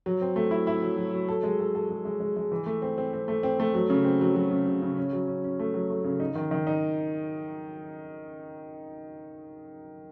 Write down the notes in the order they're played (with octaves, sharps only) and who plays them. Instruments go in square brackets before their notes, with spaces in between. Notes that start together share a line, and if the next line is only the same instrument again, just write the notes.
[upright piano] F#3
C4
A3
E4
E4
F#3
F#3
F#3
A4
G#3
A4
A4
G#3
G#3
G#3
G#3
E3
A3
C4
C4
C4
A3
C4
A3
F#3
C#3
C4
F#3
F#3
C#3
C#3
C#3
C#4
F#3
C#4
C#4
A3
F#3
A3
C#3
D#4
D#3
D#3
D#4